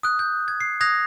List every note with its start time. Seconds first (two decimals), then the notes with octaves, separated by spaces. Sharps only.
0.03 D#6 F#6
0.19 G6
0.48 G#6
0.60 C7
0.81 D#6 F#6 G#6 A#6 F7